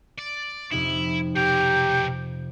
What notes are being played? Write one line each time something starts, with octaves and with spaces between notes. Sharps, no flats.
D5
F2 C3 D#4 E4
B2 G4 A#4 G6